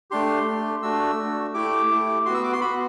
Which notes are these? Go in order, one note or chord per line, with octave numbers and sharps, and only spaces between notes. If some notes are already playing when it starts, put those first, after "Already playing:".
A3 D4 G4 C6
A3 D4 G4
A3 D4 F#4 E6
A3 D4 F#4
A3 E4 G4 D6
A3 E4 G4
B3 F#4 C6
E6
D6
C6
B3 F#4 B5